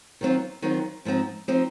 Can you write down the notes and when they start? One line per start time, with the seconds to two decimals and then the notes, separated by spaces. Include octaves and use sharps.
0.21 D#3 F#3 C4 F4
0.62 D#3 F#3 C4 F4
1.05 G#2 F3 C4 D#4
1.48 F3 C4 D#4